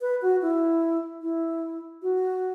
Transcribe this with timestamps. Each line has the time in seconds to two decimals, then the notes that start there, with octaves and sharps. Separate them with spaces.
0.01 B4
0.22 F#4
0.42 E4
1.22 E4
2.02 F#4